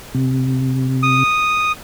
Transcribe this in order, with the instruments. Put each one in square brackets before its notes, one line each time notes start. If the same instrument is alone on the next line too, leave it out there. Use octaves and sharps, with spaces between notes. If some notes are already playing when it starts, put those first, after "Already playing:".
[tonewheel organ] C3
[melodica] D#6